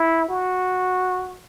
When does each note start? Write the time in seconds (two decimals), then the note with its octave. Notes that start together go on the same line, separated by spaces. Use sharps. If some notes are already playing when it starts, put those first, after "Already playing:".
Already playing: E4
0.28 F#4